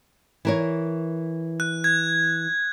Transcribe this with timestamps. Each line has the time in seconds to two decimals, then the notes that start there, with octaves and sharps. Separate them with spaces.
0.45 E3 A#4 C#5
1.60 F#6
1.84 G#6